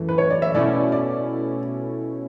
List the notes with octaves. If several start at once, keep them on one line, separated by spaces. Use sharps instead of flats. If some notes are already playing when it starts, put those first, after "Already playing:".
Already playing: F#2 E3 A3
B4
C#5
D5
E5
B2 A3 C#4 E4 D5
D5